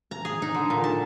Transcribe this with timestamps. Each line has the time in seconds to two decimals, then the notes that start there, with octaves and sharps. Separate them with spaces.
0.11 A#5
0.25 G#4
0.42 D#4
0.55 D3
0.70 A#2
0.84 A5